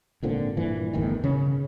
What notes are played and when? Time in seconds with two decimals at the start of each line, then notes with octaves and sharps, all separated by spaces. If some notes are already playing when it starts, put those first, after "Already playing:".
0.23 G#1 A#2 D3 C4
0.57 G2 A#2 E3
0.93 G1 E2 A2 D#3
1.24 C#3 C#4